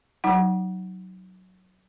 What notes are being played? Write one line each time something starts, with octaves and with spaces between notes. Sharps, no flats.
F#3 D#4 F#5